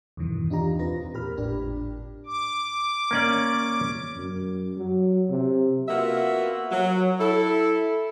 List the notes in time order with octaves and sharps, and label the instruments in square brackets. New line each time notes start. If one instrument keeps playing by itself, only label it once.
[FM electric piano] E2 G2 B2 D#3 E3
D4 D#4 F4 G4 A#5
E2 C4 F4 B4 A#6
A#2 G4 A#4 B5 F6
G#1 A2 D4 G4
[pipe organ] D6
[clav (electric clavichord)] A#3 C#4 D5
[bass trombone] F#2
F#3
C3
[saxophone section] A#3 B3 F4 F#4 E5
F#3
E4 A4